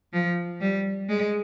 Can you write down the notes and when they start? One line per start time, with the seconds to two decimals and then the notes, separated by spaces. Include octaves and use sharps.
0.13 F3
0.61 G3
1.09 G#3